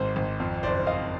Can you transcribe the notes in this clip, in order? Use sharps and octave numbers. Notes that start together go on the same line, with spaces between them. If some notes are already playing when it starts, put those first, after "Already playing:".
Already playing: G#1 G#2 C5
G#1
F2
F#1 C5 D5
F#1 D#5 F5